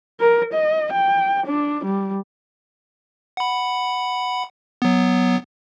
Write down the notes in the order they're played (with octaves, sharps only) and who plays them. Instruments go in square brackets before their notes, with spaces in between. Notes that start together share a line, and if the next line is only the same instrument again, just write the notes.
[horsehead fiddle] A#4
D#5
G5
D4
G3
[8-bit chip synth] F#5 B5
F#3 B3